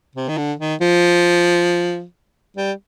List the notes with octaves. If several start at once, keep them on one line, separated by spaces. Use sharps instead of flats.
C3
D#3
D3
D#3
F3
G3